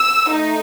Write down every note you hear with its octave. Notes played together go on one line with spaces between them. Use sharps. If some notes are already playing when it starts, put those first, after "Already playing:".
Already playing: E6
A3 D#4